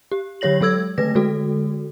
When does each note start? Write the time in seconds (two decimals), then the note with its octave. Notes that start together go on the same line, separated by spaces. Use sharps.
0.12 G4
0.41 D3 F#3 G4 C#5 A#6 F#7
0.61 F#3 G#3 A4 E6 G#6
0.98 D3 D#3 A3 B4 A#6
1.15 D3 G#3 F#4 A4